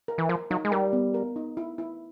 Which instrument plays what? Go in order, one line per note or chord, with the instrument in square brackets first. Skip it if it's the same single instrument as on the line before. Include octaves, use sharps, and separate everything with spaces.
[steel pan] A#4
[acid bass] E3
[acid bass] F3 [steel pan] A#4
[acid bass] F#3 [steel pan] D#4
[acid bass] G#3
[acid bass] G3 [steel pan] A#4
[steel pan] B3
A#4
D#4
E4
E4